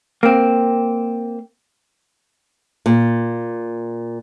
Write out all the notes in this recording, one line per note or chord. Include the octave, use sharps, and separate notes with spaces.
A#3 C4
A#2